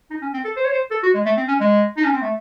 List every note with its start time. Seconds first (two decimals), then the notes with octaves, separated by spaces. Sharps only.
0.10 D#4
0.22 C#4
0.34 C4
0.45 A4
0.57 C5
0.64 C#5
0.71 C5
0.91 A4
1.03 F#4
1.14 G#3
1.26 A3
1.37 C4
1.48 C#4
1.61 G#3
1.97 D#4
2.05 C#4
2.13 C4
2.22 A3